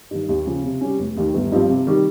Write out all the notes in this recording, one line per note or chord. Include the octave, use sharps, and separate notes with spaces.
G2 D#3
D#2
C#3 F3
C3
G3 C#4
F1
D#2 D#3
G1
G2 F3 C4
C3
D#3 G3